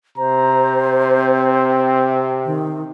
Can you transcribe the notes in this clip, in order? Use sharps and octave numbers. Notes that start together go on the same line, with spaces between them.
C3 C5 A#5
C4
D#3